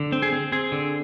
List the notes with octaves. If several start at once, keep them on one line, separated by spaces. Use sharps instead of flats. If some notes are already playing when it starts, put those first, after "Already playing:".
Already playing: D3
C4
G#4
C4
C4 G#4
D3